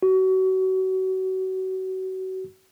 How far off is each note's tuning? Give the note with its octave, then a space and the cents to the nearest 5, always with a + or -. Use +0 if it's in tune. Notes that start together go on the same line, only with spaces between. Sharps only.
F#4 +30